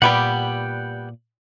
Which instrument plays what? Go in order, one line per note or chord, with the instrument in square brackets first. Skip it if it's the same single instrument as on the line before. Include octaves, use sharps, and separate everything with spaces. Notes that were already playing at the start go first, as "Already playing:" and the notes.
[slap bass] A#2 [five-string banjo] G3 B3 G4 [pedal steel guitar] F#5 G5